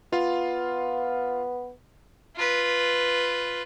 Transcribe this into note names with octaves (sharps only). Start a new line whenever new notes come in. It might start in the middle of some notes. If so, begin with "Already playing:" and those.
B3 F4 F5
F4 B4